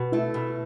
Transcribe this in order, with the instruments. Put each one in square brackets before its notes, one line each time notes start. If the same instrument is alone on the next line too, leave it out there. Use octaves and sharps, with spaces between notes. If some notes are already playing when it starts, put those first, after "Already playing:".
Already playing: [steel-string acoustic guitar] B2 [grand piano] F#4
[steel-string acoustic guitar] A3 [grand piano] E4
[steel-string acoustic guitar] B2